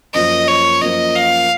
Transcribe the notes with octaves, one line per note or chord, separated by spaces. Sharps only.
F#2 F3 A#3 F4 C5 D#5
C#5
F#2 F3 A#3 F4 C5 D#5
F5